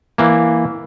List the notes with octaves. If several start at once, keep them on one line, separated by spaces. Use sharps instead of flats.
E3 A#3